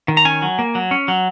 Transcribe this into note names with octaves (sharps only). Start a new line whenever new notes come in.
D#3
A#5
C#4 G#5
F#3
A#3
F#3
C#4
F#3